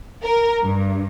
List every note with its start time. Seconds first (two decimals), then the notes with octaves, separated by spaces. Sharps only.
0.23 A#4
0.63 G2